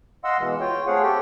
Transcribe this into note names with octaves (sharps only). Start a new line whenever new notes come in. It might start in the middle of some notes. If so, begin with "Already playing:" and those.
D#5 F5 F#5 C6 E6
B2 E3 G#3
F4 C#5 G5
A3 C4 G#4 C#5 F5 F#5
G4 A4 G5